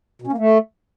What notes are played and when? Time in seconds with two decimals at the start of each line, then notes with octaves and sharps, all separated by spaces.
0.22 B2
0.27 C#4
0.32 A#3
0.38 A3